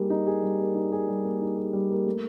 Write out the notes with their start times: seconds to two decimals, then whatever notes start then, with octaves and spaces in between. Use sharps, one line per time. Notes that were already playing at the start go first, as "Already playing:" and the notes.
Already playing: G3 A#3 D#4 G#4
0.10 D#4
0.27 G#4
0.43 G3
0.59 A#3
0.75 D#4
0.92 G#4
1.08 G3
1.24 A#3
1.41 D#4
1.57 G#4
1.73 G3
1.90 A#3
2.06 A3